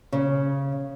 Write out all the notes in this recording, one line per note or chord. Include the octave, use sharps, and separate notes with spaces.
C#3